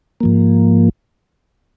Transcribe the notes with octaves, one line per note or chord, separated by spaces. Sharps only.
G#2 F3 A#3